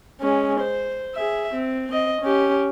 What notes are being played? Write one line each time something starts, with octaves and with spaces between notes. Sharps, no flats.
G#3 C#4
C5
G#4 E5
C4
C4 D#5
C#4 G4